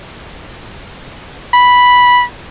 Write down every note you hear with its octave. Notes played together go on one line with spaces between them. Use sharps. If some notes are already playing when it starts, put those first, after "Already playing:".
B5